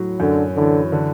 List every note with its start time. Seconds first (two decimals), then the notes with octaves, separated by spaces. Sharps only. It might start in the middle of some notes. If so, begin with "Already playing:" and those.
Already playing: A2 F#3
0.20 F#2 D3
0.56 D3 E3
0.92 D3